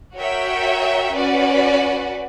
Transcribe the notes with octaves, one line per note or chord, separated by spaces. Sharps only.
F#4 A#4 C#5 E5 G5
C#4 F#4 B4 D5 F#5